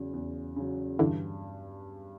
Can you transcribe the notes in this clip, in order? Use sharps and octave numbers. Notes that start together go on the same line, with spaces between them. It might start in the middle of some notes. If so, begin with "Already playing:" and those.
Already playing: E2 C#3 F#3
E2
C#3 F#3
G2 D3 E3